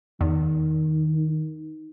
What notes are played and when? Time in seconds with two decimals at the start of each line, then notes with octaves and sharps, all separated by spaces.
0.21 E2 D#3